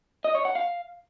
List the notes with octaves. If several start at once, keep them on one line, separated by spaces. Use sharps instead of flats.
D#5
C#5
F#5
F5